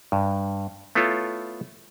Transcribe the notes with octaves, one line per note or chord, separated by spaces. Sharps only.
G2
A3 B3 E4 F4 A4 C#5